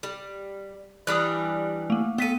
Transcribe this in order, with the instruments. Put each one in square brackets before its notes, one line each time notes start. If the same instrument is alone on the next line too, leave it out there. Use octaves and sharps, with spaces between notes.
[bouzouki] G3
[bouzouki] E3 G3 D4 [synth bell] D#6 F#6
[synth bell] A3 A#3
[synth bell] B3 B6 D#7 [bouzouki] F4 A4